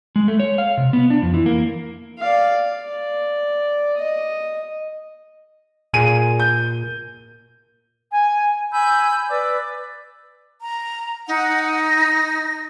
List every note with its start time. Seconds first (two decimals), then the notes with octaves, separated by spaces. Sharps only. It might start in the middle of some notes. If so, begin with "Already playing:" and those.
0.16 G#3
0.28 A3
0.40 C#5
0.58 F5
0.77 C3
0.93 B3
1.10 D4
1.22 F2
1.34 E3
1.46 A#3
2.20 D5 F5
2.72 D5
3.97 D#5
5.93 A#2 G#4 D#7
6.40 G6
8.12 G#5
8.72 G#5 B5 E6 G6
9.29 B4 D5 D6 E6
10.61 A#5
11.28 D#4 F#5
11.87 A#6